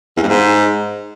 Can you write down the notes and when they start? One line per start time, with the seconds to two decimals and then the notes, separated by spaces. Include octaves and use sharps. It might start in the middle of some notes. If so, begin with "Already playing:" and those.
0.17 E2
0.23 G2
0.28 G#2